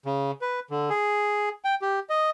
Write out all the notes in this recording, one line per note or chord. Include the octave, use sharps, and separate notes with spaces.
C#3
B4
D3
G#4
G5
G4
D#5